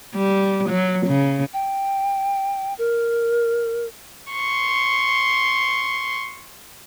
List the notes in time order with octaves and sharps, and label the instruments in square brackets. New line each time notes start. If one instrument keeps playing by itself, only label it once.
[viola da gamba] G3
F#3
C#3
[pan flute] G5
A#4
[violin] C6 C#6